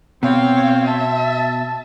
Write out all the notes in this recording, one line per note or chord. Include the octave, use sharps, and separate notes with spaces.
B2 C4 C#5 F5
E5 A5